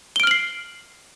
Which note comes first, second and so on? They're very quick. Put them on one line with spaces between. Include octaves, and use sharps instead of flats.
G7 D7 F6 F#7 C7